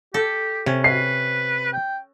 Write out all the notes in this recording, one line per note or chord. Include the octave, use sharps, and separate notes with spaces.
G4 A4
C3 C#4
B4 C7
G5